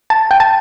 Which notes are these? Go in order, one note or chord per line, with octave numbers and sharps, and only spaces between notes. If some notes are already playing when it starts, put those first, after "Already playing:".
A5
G5
A5